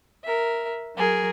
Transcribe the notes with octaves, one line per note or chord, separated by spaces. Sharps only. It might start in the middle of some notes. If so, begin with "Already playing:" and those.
A#4 E5
F#3 G#4 A#4